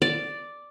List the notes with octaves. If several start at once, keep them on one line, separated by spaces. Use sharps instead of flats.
D5